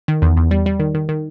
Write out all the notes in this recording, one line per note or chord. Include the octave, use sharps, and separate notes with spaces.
D#3
E2
E2
G3
G3
D#3
D#3
D#3